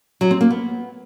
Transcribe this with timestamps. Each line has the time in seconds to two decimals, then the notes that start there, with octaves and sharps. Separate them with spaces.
0.21 F#3
0.31 C4
0.41 A#3
0.50 B3